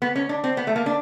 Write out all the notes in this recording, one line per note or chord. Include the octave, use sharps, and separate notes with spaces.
B3
C#4
D4
C4
B3
A3
A#3
D4